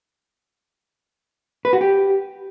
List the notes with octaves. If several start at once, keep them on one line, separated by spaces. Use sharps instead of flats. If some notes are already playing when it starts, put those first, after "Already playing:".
B4
F#4
G4